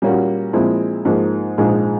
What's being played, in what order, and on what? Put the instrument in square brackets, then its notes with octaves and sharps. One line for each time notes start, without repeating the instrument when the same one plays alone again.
[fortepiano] A#2 G3 A#3 C#4 F#4
A#2 F3 G#3 C4 E4
G#2 F3 A#3 D#4 G#4
A#1 G#2 F3 G#3